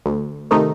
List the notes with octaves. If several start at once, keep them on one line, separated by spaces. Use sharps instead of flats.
D2
C3 D#3 A3 D#4